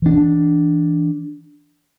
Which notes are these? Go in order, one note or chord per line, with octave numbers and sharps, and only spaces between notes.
E3 D4